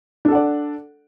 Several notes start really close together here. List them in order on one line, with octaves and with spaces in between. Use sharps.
D4 A4 F#5 D5